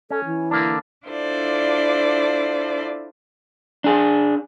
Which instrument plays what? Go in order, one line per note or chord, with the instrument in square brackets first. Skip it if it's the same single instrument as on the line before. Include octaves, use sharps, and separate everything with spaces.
[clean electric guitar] C#4 [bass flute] A4
[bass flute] E3
[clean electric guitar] D3 A#3 D4
[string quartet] D4 E4 F4 A4 C5 D5
[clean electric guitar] D4 G#4